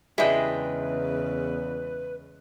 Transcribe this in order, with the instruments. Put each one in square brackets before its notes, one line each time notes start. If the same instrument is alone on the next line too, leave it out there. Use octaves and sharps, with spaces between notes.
[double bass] E2 C#3 [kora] G#3 D4 D#5 [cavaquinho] E4 G5 [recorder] B4